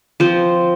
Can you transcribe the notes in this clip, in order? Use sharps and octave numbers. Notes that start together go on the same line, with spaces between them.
F3 C4 F4 C5